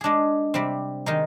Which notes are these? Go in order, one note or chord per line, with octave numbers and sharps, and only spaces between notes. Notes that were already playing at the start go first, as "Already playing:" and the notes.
G#3 D4 G#4
C3 G3 C4
D#3 G#3 D#4